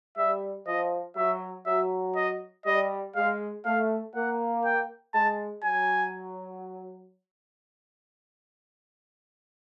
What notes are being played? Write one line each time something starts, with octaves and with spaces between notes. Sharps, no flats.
G3 E5
F3 D#5
F#3 E5
F#3 E5
D#5
G3 D#5
G#3 F5
A3 F5
A#3 F#5
G5
G#3 A5
F#3 G#5